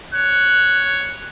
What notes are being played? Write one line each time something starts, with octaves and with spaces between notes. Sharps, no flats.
C#5 F#6